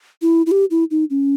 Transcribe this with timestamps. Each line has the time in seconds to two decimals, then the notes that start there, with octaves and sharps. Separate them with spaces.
0.22 E4
0.46 E4
0.51 G4
0.71 E4
0.91 D#4
1.10 C#4